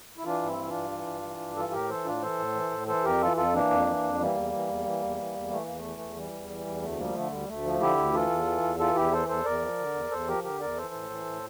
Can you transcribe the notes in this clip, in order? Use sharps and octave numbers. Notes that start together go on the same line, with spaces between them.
E4
E3 D4 F4
G2 C4 E4
E3
D4 F4
G2
E3
G2
E3
G2
E3 F4 A4
A2 G4 A#4
E3 A4 C5
A2 D4 F4
E3 A4 C5
A2
E3
A2
E3 A4 C5
F2 G4 A#4
E3 F4 A4
F2 F4 A4
E3 A#3 D4
F2
E3
F2
E3 G3 A#3
E2
E3
E2
E3
E2
E3
E2
E3 A3
E2 A#3
A3
E3
E2
E3 G3
E2
E3
E2
D2 A3
F3 G3 A#3
D3 A3
D2 G3
D2 A3
F3
D3 E4 G4
D2
E3 F4 A4
E2
E3
E2
E3 F4 A4
E2 E4 G4
E3 A4 C5
E2 A4 C5
E2 A#4 D5
F3
D3
E2
E2 A4 C5
F3 G4 A#4
D3 G4 A#4
E2 A#4 D5
E3 A4 C5
A2
E3
A2